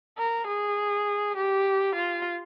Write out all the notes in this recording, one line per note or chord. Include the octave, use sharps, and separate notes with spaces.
A#4
G#4
G4
F4